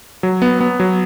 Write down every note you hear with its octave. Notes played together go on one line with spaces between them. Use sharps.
F#3
B3
B3
F#3